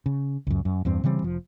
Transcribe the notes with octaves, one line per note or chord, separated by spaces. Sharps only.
C#3
C#2 F#2
F#2
E2 G2 C4
C#3 E3 G3 C4
F1 F3